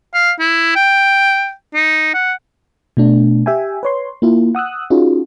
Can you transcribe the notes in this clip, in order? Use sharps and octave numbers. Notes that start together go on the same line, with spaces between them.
F5
E4
G5
D#4
F#5
B2 A3 D4
G4 E5 G5 G#5
B4 C#5 C6
A#3 E4 F4
F#5 D#6 E6 F#6
C#4 D#4 F4 F#4 G#4